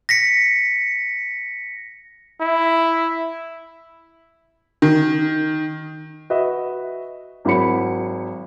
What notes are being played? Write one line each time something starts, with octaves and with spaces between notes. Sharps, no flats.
A#6 B6 C#7
E4
D#3
F#4 B4 D#5 E5
G#1 F#3 E4 B5 C#7